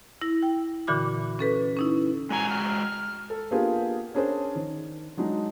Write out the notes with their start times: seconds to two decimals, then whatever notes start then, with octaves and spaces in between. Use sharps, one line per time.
0.21 E4 A#6
0.43 G5
0.87 A#2 D3 E3 F#4 B5 D6
1.39 C#4 A4 B4
1.77 C#4 D#4 E4
2.30 G#3 F#4 G#5 A#5
2.50 F6
3.30 A4
3.51 A#3 B3 D4 F4 G4 G#4
4.14 C#4 D4 G#4 A#4 C5
4.55 D#3
5.17 F#3 G#3 D4 D#4